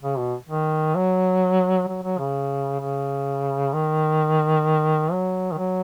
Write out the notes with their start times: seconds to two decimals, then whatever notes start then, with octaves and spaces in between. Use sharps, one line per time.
0.02 C#3
0.18 B2
0.49 D#3
0.95 F#3
1.88 F#3
2.03 F#3
2.19 C#3
2.81 C#3
3.74 D#3
5.12 F#3
5.52 D#3
5.58 F#3